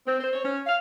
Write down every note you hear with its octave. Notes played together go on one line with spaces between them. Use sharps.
C4
C5
C#5
C#4
F5